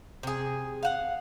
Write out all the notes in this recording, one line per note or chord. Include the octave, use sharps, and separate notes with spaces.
C3 G#4
F5 F#5